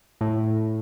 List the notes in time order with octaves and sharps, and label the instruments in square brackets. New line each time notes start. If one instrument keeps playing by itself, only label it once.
[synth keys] A2